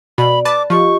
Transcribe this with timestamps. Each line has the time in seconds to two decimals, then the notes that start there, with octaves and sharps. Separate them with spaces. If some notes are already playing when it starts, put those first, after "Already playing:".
0.18 B2 D5 B5
0.45 B4 A5 D6
0.70 F3 F4 G4 D#5 C#6